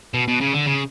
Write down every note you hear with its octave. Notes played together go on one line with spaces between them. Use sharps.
B2
B2
C#3
D3
C#3